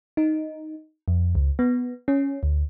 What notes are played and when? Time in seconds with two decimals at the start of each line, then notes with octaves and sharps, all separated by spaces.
0.17 D#4
1.08 F2
1.35 C#2
1.59 B3
2.08 C#4
2.43 D2